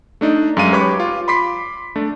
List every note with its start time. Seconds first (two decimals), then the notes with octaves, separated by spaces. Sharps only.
0.21 A3 D4 D#4
0.57 F#2 G#3 F5 D#7
0.72 G4 B4 C#5 B5 C#6 D6
1.00 F4
1.28 B5 C6 D6 B6 C7
1.96 A3 D4